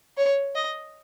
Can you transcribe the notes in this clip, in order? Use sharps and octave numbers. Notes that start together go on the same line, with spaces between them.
C#5
D#5